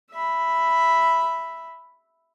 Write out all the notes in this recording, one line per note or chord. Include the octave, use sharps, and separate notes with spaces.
E5 B5